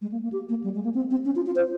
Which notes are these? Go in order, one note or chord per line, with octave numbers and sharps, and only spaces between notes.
G#3
A#3
A#3
G4
A#3
G3
G#3
A#3
C4
C4
C#4
F4
F4
C5